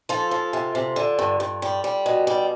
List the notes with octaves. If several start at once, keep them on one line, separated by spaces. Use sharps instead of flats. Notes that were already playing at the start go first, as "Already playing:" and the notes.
F3 F4 A4
F3
C3
C3
D3
G2
G2
G3
G3
B2
G3